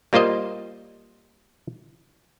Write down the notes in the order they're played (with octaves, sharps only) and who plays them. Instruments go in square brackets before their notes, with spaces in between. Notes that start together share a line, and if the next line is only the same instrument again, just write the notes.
[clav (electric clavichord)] G3 A#3 F4 C5 D#5